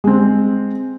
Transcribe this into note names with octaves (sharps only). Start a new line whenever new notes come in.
G#3 C4